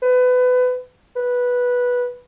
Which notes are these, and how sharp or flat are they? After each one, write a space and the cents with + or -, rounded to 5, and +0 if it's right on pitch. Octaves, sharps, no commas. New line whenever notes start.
B4 +25
B4 -10